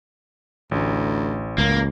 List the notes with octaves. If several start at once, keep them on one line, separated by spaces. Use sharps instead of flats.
A1 D2
C#2 A#3